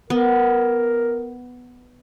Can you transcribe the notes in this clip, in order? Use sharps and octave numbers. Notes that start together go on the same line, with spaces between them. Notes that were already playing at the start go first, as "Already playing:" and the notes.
B3 A#4